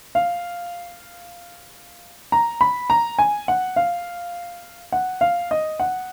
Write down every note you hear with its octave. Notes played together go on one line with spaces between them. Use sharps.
F5
A#5
B5
A#5
G#5
F#5
F5
F#5
F5
D#5
F#5